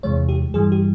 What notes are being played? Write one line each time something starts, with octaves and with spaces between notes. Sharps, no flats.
E2 C3 E3 G#3 C#5
G4
G2 E3 G3 G#4
G4